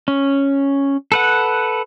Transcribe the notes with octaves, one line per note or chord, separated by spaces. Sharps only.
C#4
A4 B4 F#5